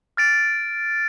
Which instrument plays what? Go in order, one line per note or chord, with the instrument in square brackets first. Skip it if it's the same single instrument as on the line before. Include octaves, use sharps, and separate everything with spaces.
[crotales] F6 A6 D7